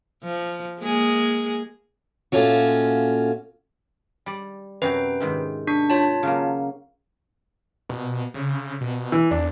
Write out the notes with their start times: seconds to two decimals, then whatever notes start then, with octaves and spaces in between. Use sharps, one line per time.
0.24 F3
0.81 G#3 A#3 G#4
2.32 A#2 A3 C#4 F4 F#4
4.26 G3 D5
4.82 F#2 C3 F#3 B4 G5
5.20 G#2 D#3 C4
5.67 D4 C#6 B6
5.90 F4 C#5 A5
6.23 C#3 F#3 A#3
7.89 B2
8.34 C#3
8.81 B2
9.12 E3
9.31 E2 D4